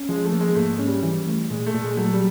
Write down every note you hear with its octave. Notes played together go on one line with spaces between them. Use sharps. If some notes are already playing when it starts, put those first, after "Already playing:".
Already playing: C#4
F3 G#3
A3
A#3
G#3
G#2 A3
G#3
C#4
G3
E3
A3
A#2 G#3
A3
A#2
G#3
F#3 A3
G3